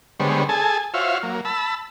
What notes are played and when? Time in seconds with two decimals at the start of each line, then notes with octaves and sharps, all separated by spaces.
0.20 D3 G3 G#3 B3 C5 C#5
0.49 G#4 A4 G#5 A5
0.94 F4 F#4 C5 C#5 E5 F5
1.23 F#3 A#3
1.45 A5 B5 E6